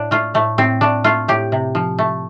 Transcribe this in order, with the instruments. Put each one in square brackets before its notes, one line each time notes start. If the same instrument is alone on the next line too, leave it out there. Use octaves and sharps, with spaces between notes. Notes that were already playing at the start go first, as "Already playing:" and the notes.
Already playing: [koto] A2 D4
A3 F4
A2 A3
A2 C4
A3 D4
A3 F4
A2 G4
C3
F3
A3